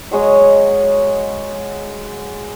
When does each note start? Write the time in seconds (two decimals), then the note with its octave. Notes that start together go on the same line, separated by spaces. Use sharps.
0.11 F#3 G#3 C#5 D#5